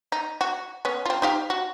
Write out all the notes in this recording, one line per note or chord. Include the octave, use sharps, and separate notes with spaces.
D#4
F#4
B3 C#4
C4 F4
D#4 G4 F5
F#4